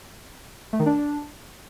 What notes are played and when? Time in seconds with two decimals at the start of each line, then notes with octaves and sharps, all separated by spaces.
0.73 A3
0.79 D#3
0.86 D4